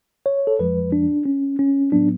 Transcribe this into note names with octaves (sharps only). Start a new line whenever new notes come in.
C#5
A4
F2 F3 G#3 B4
D4
C#4
C#4
A2 F#3 B3 D4